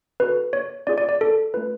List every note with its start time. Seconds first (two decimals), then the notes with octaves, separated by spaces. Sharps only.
0.20 C#4 F#4 A4 B4
0.53 C#5
0.87 C#4 F4 G#4 D5
0.98 D5
1.09 D5
1.21 A4
1.54 A3 C#4 F4 B4